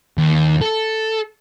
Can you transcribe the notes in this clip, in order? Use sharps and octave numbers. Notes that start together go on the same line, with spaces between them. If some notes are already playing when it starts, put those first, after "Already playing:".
D#2
A4